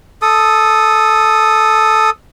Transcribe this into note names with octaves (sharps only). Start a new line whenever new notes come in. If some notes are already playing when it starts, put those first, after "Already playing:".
A4 D#6